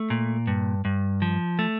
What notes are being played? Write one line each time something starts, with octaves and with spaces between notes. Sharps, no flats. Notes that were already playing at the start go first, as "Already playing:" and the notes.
Already playing: A3
A#2
G2
G2
F3
A3